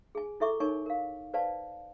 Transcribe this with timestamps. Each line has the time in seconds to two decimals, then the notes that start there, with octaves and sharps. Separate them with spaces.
0.15 G#4 G#5
0.40 E4 A4 E5 C#6 D6
0.60 D#4 A#4 C#5 G#5 C#6
0.86 A#4 F5
1.34 B4 C5 D5 F5 A5